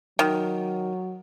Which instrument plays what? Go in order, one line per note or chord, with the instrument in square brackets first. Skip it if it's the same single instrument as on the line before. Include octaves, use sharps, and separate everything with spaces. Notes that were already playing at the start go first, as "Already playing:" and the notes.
[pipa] D#3 [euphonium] F#3